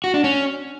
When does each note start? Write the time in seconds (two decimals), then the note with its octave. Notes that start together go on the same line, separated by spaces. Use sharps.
0.04 F#4
0.14 D4
0.24 C#4